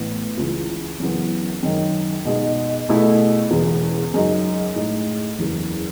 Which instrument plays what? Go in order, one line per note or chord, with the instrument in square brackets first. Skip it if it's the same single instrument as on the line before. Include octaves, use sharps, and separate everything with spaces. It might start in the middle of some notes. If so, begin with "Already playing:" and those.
Already playing: [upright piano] A1 A2 E3 B3
C#2 C#3 E3
F#2 C#3 E3 B3
F#2 D#3 G#3 C#4
B2 G#3 D#4
B2 A3 E4 G#4
E1 E2 C#3
F#2 C#3 G#3 D#4 F#4
A2 G#3 D#4 G#4
F#1 E2 C#3